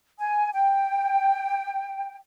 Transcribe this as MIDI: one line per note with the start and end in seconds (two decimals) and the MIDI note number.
0.19 0.50 80
0.53 2.16 79